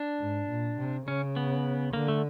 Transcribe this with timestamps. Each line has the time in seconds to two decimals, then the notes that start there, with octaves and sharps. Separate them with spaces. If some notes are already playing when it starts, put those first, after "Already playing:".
Already playing: D4
0.20 G#2
0.49 A#2
0.78 C3
1.07 C#3 C#4
1.36 B3
1.93 D3 A#3
2.08 A3